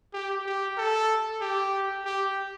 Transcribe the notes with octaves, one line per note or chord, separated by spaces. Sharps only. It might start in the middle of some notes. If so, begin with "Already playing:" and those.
G4
G4
A4
G4
G4